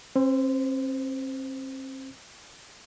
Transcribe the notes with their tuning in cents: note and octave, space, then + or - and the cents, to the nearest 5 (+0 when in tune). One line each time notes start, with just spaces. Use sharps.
C4 +40 C5 -20